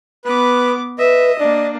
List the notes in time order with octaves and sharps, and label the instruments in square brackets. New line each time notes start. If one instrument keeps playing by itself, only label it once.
[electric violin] B3 D6 [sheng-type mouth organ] B4
[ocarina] B4 [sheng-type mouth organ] D#5 [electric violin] E5
[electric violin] A#3 D4 [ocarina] D5